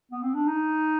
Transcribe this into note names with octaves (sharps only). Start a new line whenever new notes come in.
B3
C4
D4
D#4